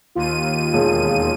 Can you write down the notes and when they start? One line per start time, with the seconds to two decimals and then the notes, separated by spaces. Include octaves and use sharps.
0.15 D#2 F4 D#7
0.73 E1 G#4